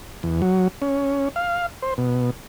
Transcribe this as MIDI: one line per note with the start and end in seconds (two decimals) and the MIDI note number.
0.23 0.42 40
0.42 0.68 54
0.82 1.29 61
1.36 1.66 77
1.82 1.94 72
1.98 2.31 47